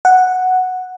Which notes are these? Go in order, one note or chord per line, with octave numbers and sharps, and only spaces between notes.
F#5